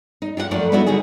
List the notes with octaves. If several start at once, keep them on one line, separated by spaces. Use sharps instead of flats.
D#4
F4 G4 B4 F#5
F#2 F3 A3 A4 A#4 D5
B3 C#4 D#4 E4 F#4 A4
D3 G3 D#4 F#4 G#4